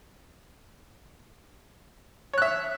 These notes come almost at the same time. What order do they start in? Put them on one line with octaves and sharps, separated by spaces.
C#5 F#6 E5